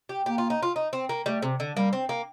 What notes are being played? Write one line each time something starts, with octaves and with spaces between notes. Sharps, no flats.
G4
A#3 G4
F4
D#4
F4
D#4
C4
A#3
G3 A3
C3
D3
G3 A#3
C4
A#3